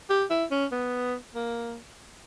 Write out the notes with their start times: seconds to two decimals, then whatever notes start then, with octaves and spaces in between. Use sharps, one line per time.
0.10 G4
0.30 E4
0.51 C#4
0.72 B3
1.34 A#3